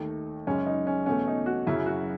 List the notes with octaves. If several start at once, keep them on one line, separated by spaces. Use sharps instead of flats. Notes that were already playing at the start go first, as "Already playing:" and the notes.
Already playing: D#2 D#3 A3 D#4
F#2 C#3 G#3 C#4
D#4
C#4
E2 B2 A3 C#4
D#4
F#4
F#2 C#3 F#3 E4
F#4